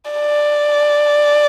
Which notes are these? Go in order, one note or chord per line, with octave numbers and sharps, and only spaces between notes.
D5